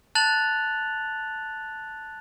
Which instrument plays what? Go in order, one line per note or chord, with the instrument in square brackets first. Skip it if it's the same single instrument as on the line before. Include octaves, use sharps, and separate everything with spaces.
[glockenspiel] A5 F#6 A6 F7 F#7